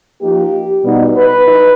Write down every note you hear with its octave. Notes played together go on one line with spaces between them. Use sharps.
F3 A#3 D#4 G4
B2 G3 B3 D#4
B4
D#4